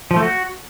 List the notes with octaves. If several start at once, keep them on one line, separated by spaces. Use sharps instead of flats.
F3
A3
F#4